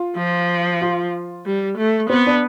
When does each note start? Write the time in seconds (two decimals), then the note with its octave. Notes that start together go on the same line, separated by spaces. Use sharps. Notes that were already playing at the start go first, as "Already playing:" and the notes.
Already playing: F4
0.17 F3
0.81 F4
1.46 G3
1.78 A3
2.10 B3 C4
2.26 D4